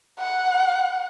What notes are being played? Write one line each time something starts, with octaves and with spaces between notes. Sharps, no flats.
F#5